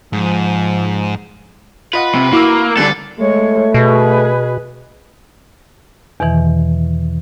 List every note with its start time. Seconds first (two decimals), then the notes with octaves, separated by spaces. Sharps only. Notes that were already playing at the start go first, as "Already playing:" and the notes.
0.13 G#2 F3
1.93 F4 B4 D#5 F#5
2.15 C3
2.32 A#3 E4 F#4 D6 E6
2.77 D#2 D3 G3 D4 A4
3.19 G#3 A3 C#5
3.74 B2 G#4 B4
6.20 E2 B2 D#3 E3